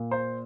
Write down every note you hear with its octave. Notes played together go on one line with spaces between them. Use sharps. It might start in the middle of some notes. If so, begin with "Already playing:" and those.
Already playing: A#2
C5